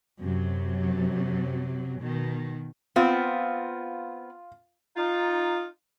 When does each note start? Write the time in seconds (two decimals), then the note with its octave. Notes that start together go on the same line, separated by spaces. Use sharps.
0.24 F#2 C3 F#3
2.01 B2 D#3
2.96 B3 C4 F4
4.96 D#4 F4